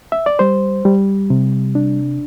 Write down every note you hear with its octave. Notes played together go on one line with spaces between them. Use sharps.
E5
D5
G3 C5
G3
C3
D4